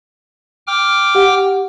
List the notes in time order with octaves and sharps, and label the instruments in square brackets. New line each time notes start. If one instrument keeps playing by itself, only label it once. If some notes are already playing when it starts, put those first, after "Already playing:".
[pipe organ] G5 D6 F6
[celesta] G4 F#5